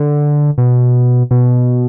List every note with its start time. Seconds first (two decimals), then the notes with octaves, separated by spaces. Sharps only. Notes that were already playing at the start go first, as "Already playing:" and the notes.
Already playing: D3
0.58 B2
1.31 B2